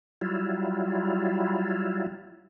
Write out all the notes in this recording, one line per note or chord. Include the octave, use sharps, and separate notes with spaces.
F#3 G3 E4 F4